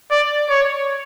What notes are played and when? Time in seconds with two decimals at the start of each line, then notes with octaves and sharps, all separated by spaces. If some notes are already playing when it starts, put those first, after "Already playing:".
0.11 D5
0.50 C#5